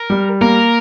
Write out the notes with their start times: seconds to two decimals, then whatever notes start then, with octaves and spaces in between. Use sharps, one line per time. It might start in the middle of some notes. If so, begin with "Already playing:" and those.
Already playing: A#4
0.10 G3
0.41 A#3 A#4